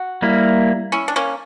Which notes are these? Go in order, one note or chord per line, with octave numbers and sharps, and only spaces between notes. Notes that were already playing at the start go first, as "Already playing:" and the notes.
Already playing: F#4
G3 A#3 E4
C#4 E4
D4
A#3 C#4